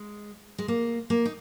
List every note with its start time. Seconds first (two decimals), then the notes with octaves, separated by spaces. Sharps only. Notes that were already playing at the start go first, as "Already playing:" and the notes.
Already playing: G#3
0.58 G#3
0.68 A#3
1.10 A#3
1.26 D#4